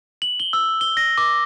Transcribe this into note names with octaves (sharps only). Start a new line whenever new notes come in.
F#7
G7
E6
G7
A#6
D6